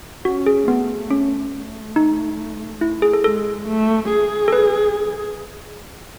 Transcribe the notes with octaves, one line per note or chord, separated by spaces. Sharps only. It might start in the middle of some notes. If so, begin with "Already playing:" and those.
C#4 F#4
G#4
A3 B3
C#4
A3
D#4
E4
G#4
A4
G#3 A4
A3
G#4
A4
B4